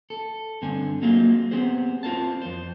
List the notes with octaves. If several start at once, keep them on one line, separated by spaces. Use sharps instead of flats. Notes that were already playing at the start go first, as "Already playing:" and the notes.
A4
G2 D3 C4 G#5
F#3 G#3 A#3 C4 F4
B3 C4 G4 G#4 C5
C4 F4 A#4 C5 A5
F2 C5